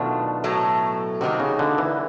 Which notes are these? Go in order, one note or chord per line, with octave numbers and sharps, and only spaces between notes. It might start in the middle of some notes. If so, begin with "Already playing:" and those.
Already playing: B2 D#3 F#3 A3 D4 F4
A2 F#3 A3
C3 D#3 G3 A#3 D#4 F#4
C#3
D3
E3